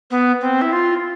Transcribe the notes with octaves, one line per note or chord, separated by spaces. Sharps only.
B3
C4
E4
F4